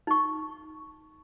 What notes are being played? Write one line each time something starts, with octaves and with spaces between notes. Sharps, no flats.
D#4 C#6